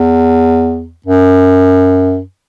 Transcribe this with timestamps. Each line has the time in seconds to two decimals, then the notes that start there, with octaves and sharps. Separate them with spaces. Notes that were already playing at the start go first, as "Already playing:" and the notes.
Already playing: E2
1.06 F#2